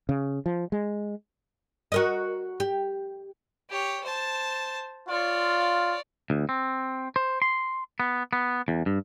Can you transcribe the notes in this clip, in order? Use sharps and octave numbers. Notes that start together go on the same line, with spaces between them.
C#3
F3
G#3
F#4 A#4 D#5
G4
G4 C#5
C5 A5
F4 C#5 D5
D2
C4
C5
C6
B3
B3
E2
G2